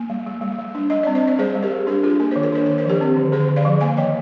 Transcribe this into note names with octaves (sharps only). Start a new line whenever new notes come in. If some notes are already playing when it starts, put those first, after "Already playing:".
Already playing: A#3
G3
G3
G3
G3
D4
G3 D#5
C4 D5
C5 D#5
C4 D5
G3 G#4 C5
G3
G4 A#4
G3
D4 G4 A#4
D4 F4 G#4
A#3 A#4
D#3 C5
A#4
D4 C5
D#3 A#4
C5
F3 G4 A#4
C4
D3
D3 G#4 C5
D3
D5 F5
F3
A#3 F5 G#5
D#3 D#5 G5